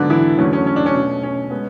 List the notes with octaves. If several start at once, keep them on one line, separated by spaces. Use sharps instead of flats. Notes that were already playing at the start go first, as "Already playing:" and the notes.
Already playing: G#2 D3 F#3 B3 D4
E3 E4
E2 D3 F#3 A3 C#4
C#4
C#4
D4
C#4
B2 A3
C#4
G#3 B3